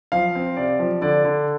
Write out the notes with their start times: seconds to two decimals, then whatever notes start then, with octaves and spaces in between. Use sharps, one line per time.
0.12 F3 F5
0.35 C4
0.57 C3 D5
0.79 F3
1.02 D3 D5
1.24 D3